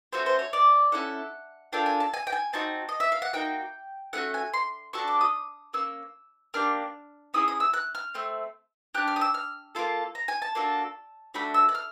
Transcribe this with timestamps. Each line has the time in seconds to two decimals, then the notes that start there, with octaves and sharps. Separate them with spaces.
0.13 A3 C#4 F#4 C5
0.26 C5
0.39 C#5
0.53 D5
0.92 C#4 E4 A4 F#5
1.73 A#3 D4 F4 A4 G5
1.86 G#5
2.00 A5
2.14 G#5
2.27 G5
2.32 G#5
2.53 C4 D#4 F#4 A5
2.89 D#5
3.00 E5
3.12 F5
3.22 F#5
3.33 A#3 D#4 F#4 G5
4.13 A3 C#4 F#4 F#5
4.34 G#5
4.53 C6
4.93 D4 F#4 A4 C#6
5.08 D6
5.21 D#6
5.73 A#3 C#4 E6
6.54 A#3 D4 G4 F6
7.34 C#4 E4 G#4 D#6
7.48 D#6
7.60 E6
7.74 F#6
7.95 F6
8.14 A3 C4
8.94 D4 G4 F#6
9.08 F6
9.16 D#6
9.21 E6
9.34 F6
9.75 A#3 C#4 F4 A4
10.15 A#5
10.28 G#5
10.42 A5
10.55 A#3 D4 F#4 A4
11.34 A3 D4 F#4 B5
11.54 E6
11.69 F#6
11.75 F6